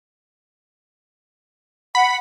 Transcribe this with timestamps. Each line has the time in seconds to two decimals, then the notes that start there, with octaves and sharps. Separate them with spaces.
1.95 F#5 B5